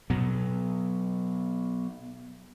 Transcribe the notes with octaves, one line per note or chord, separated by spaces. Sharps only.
B2 F#3 B3